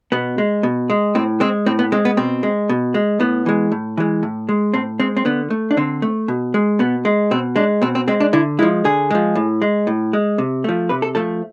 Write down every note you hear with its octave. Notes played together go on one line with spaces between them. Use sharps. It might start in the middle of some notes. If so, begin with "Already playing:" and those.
B2 B3
G#3
B2
G#3
A2 C4
G#3 C4
A2 C4
B3
G#3 C4
B3
B2 C4
G#3
B2
G#3
A2 B3
E3 G#3
A2
E3 G#3
A2
G#3
A2 C4
G#3 C4
C4
D3 B3
A3
D4
D3 C4
A3
B2
G#3
B2 B3
G#3
B2 C4
G#3 D4
B2 C4
C4
G#3 C4
D4
D3 E4
F3 G#3 E4
D3 G#4
F3 G#3
A2
G#3
A2
G#3
C3
F3 A3
C3 B4
A4
F3 A3 A4